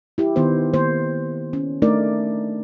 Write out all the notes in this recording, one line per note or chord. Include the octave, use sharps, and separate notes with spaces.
E4 G4
D#3 B3 D#4 C5
D#3 A#3 C5
C#4
A3 D4 D#4 A#4 D5